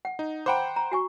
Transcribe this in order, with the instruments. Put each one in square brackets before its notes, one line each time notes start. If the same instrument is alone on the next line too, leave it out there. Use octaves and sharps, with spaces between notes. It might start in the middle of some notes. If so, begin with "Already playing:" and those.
[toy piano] F#5
[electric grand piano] D#4
[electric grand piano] C5 F#5 G5 [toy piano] A#5 B5 D6
[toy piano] A#5
F#4 G#5 C#6